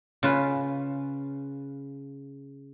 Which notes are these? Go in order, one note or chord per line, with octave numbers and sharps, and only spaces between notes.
C#3 F4 B4